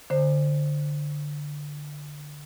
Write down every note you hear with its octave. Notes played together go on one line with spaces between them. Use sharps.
D3 C5